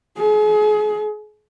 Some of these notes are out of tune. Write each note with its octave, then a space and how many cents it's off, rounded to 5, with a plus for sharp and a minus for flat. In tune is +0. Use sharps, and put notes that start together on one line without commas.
G#4 +35